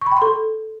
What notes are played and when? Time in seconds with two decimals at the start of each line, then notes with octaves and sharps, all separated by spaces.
0.01 C#6
0.07 B5
0.12 G5
0.17 C6
0.22 A4